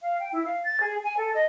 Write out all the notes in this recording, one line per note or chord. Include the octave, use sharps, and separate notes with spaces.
F5
G5
E4
F5
A6
G#4
G#5
A4
D#5